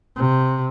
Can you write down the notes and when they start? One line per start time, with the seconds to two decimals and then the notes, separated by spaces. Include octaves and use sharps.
0.16 C3